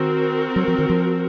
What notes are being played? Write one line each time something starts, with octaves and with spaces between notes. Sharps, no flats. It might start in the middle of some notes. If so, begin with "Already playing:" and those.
Already playing: D#3 C4 F#4 A#4
F#3
F3
D#3
F3